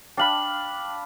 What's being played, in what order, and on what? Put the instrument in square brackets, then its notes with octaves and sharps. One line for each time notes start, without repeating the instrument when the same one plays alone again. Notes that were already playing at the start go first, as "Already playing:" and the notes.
[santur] D4 F5 B5 [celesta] G5 F#7